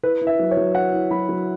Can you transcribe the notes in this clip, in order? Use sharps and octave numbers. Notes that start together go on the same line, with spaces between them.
E4 B4
E4
E5
F#3
C#5
F#3
E4 F#5
E4
F#3 B5
F#3